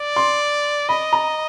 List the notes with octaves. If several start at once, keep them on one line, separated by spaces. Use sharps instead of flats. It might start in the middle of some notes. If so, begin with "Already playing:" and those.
Already playing: D5
C6
D#5 B5
A#5